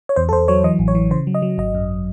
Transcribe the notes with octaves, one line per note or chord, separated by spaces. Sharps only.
C#5
E2 C5
A4
E2 C5
F#3 C#5
E3 D#5
A1
C#5
E3
C#3 C5
F#3
D#5
F#3
G#1 D#5
F#2